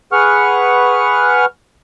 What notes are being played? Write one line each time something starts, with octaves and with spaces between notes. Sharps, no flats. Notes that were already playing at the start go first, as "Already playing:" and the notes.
G#4 B4 F#5 C#6 F6